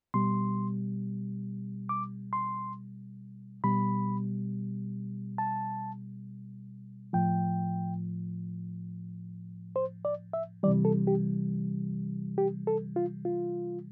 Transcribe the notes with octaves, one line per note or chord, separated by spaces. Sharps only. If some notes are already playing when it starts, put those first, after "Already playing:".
B2 G3 C6
D6
C6
B2 G3 B5
A5
A2 F3 G5
C5
D5
E5
C3 E3 G3 D5
A4
G4
G4
A4
F4
F4